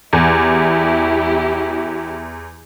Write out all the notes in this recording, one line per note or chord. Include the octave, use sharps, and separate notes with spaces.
E2 E4 G4